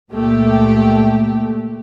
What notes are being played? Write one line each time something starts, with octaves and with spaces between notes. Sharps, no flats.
C#2 A#2 A3 G4